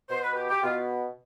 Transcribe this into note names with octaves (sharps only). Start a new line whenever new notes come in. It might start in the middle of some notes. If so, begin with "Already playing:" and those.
B2 C5
B4
G4
G4
B2 F4